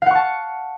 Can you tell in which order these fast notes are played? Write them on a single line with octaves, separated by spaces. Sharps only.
F5 F#5 C#6 A5